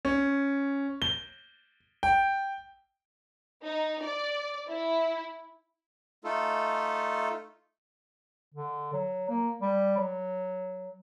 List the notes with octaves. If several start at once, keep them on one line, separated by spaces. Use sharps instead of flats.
C#4
G7
G5
D#4
D5
E4
A3 D#4 F4 A4
D3
F#3
A#3
G3
F#3